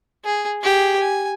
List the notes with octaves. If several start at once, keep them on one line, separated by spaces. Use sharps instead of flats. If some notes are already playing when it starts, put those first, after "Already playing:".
G#4
G4 G#4
G#5